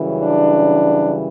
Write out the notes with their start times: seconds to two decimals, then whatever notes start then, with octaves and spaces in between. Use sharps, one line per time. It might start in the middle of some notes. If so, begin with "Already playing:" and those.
Already playing: F#2 C#3 E3 G3
0.19 D4